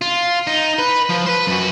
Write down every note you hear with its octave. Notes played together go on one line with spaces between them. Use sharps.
F4
D#4
B4
F3
B4 C5
F#2 F#4